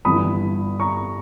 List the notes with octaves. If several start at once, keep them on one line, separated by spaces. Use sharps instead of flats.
G1 G2 E3 B5 D#6
A#5 C#6